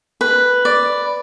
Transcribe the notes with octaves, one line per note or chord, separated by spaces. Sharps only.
B4
D5